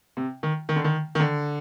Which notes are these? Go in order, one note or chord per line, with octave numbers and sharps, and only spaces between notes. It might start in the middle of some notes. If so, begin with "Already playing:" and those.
C3
D#3
D#3
D3
D#3
D#3
D3